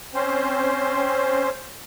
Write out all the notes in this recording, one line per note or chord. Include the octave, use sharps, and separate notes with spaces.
C4 C#4 C5